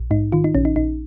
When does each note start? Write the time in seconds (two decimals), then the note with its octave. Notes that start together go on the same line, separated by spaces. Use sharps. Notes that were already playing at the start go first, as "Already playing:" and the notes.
Already playing: A#1
0.11 G#2 D#4
0.32 D#3 F4
0.44 D#4
0.55 A#1 C#4
0.65 D#4
0.76 A#1 D#4